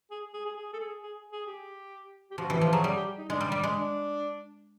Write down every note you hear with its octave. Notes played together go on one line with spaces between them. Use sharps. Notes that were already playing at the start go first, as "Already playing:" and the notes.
G#4
G#4
G#4
G#4
A4
G#4
G#4
G#4
G4
G4
F3 F#4
E3 G4
F3 G4
F#3 G#4
G3 G#4
G4
D#4
G#3 D4
G3
G3
G#3
D4